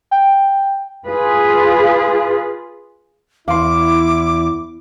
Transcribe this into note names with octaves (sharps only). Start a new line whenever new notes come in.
G5
F4 G#4 B4
E2 E4 F5 C6 D6